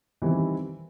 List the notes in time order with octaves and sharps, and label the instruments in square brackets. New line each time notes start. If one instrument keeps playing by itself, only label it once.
[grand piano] D#3 E3 G3 C4 E4